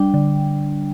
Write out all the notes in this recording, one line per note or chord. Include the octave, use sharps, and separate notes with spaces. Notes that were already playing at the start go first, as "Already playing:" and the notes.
Already playing: G3 D4 G5
D3